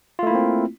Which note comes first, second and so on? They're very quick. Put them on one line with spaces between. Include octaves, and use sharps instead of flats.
F4 A3 E4 A#3 C4